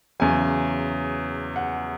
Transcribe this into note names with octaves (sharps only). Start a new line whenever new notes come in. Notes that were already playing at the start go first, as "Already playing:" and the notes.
E2 C#3 F#3 G#5
F#5